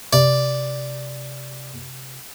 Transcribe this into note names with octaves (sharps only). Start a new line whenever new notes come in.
C3 D5